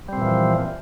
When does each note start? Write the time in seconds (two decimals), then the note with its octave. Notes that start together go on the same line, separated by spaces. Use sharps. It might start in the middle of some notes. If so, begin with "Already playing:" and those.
0.08 G3
0.13 C4
0.17 A#2
0.22 E3
0.26 F3